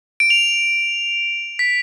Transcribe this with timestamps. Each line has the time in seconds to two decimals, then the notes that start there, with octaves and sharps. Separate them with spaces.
0.20 D7
0.30 F7
1.59 B6